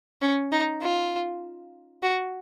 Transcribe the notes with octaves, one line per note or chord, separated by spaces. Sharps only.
C#4
D#4
F4
F#4